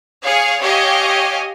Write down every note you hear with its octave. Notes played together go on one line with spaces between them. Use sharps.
G#4 C#5 F5
G4 C#5 D#5 F5 G#5